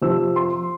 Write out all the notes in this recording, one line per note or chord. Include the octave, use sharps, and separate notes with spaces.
F2 C3 F3 E6
C6